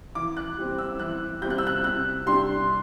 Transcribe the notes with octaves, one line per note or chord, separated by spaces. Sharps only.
E3 D6
F#6
G3 C4
E6
E3 F#6
G3 C4 G6
F#6
E6
F#6
C3 F#6
G3 D4 C6